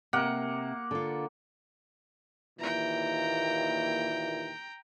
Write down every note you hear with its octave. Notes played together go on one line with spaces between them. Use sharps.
C3 A#3 F#5
D3 F4
D#2 A#2 E3 G5 A#5